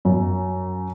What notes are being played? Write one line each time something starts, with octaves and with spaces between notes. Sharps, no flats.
F#2